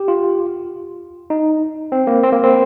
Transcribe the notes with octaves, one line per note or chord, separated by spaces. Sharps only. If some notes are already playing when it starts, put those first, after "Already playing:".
Already playing: G4
F4
D#4
C4
A#3
C4
A#3
C4